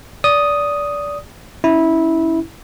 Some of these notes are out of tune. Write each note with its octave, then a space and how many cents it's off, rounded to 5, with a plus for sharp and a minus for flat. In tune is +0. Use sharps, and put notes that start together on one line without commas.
D5 -20 D#6 +0
C#4 +20 E4 -15